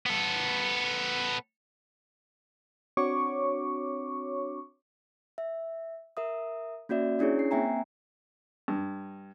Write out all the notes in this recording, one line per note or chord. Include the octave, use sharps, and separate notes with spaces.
B3 A4
C4 D4 F#4 C#5 C#6 D6
E5
A#4 E5 D#6
A#3 C#4 F#4 D5 E5
C#4 D4 E4 G#4 C#5
C7
A#3 C4 E5 G5 G#5 A#5
G2